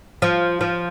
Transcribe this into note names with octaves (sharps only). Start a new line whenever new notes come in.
F3
F3